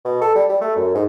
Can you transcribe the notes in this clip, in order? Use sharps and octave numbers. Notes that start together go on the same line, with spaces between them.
B2
A4
G3
G3
A3
F#2
G#2